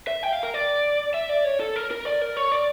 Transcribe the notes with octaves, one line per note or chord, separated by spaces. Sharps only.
E5
G5
F5
A#4
D5
E5
D5
C#5
A4
A#4
A#4
D5
A#4
C#5
D5